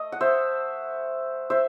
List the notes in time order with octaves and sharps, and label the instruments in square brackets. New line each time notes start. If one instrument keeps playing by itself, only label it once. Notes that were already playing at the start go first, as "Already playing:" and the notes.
Already playing: [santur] A3 A4 D#5
F#5
C5 E5
C5 E5